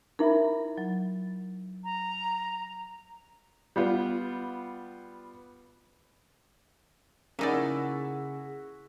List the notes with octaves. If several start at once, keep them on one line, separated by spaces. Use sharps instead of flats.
D#4 E4 A#4 E5 B5
F#3
A#5
G3 B3 F4
C#3 A#3 D#4 E4 F#4 G#4 D5 E5